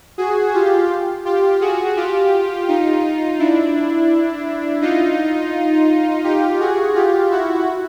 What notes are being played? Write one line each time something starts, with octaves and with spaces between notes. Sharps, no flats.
F#4 G#4
F4 G4
F4 G4
F#4 G#4
F4 G4
D#4 F4
D4 E4
D#4 F4
F4 G4
F#4 G#4
F4 G4
E4 F#4